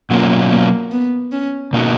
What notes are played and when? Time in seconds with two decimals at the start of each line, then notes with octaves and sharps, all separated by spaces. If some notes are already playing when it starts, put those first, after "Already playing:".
0.10 B2 F#3 A#3 C#4 F4
0.51 A#3
0.91 B3
1.32 C#4
1.73 B2 A#3 D#4 F#4